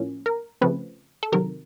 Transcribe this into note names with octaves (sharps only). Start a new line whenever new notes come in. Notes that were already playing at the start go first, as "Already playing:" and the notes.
Already playing: A2 F3 A#3 C#4
A#4
C#3 F3 A3 C4 B4
A4
C3 D#3 F#3 A#4